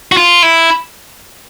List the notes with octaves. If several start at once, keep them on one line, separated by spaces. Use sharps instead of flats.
F#4
F4
E4